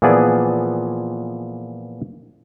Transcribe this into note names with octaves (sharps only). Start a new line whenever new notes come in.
A#2 E3 F3 B3 G#4 D5